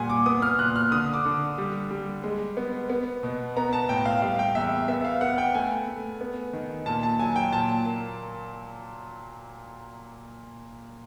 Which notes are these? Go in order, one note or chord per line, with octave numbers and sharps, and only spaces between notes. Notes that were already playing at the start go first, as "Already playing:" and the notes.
Already playing: A#2 G3 F#5 G#5
D6
B3 D#6
F6
A#2 F#6
F6
D3 D#6
D6
D3
G3
G3
G#3
B3
B3
B2
B3 A#5
A5
A2 G5
F5
G3 F5
G5
E2 E5
B3 E5
F5
B3 F#5
G5
A3 G#5
A3
B3
D#3
A#2 A5
A5
F#3 G#5
G5
A#2 A5
A#3